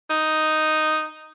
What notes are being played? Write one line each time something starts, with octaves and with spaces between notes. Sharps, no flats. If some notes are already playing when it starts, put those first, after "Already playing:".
D#4